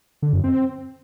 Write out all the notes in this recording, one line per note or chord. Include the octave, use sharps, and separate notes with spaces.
D3
F#2
C4